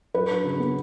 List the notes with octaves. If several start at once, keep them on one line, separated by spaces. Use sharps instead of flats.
F#3 B4
D4
C#3
B3